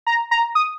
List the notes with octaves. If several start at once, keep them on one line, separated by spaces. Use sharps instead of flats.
A#5
A#5
D#6